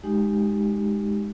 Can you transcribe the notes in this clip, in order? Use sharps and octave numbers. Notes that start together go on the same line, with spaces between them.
G#3 D#4 G4